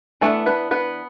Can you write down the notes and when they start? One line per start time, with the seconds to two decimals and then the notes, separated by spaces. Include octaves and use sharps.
0.21 E3 A3 B3 D4 A4
0.46 B3 B4
0.71 B3 B4